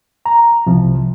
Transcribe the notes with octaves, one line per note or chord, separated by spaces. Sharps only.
A#5
C2 C3 F3